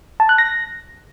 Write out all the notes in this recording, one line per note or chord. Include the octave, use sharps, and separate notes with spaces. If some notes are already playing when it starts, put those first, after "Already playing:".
A5
F#6
A#6